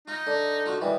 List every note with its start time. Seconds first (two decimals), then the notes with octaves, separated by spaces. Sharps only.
0.08 D#4 F4
0.26 D3 D4
0.66 F4 F#4
0.81 D#3 E3 G3